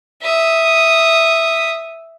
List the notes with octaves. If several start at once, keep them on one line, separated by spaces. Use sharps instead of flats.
E5 D#6